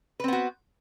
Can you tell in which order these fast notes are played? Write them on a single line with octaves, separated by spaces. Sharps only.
B4 C4 B3 F#4